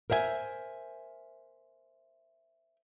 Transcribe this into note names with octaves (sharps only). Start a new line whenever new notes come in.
A#4 C5 E5 F5 G#5